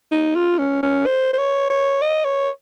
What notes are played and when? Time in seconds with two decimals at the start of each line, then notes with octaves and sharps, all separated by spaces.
0.12 D#4
0.36 F4
0.59 C#4
0.83 C#4
1.06 C5
1.34 C5
1.38 C#5
1.70 C#5
2.02 D#5
2.25 C#5